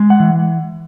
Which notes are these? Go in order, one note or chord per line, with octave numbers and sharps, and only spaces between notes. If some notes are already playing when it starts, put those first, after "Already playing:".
Already playing: G#3
F#5
E3